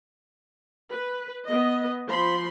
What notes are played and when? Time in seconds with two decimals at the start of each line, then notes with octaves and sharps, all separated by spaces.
0.93 B4
1.46 B3 D#5
2.09 F3 B5 C6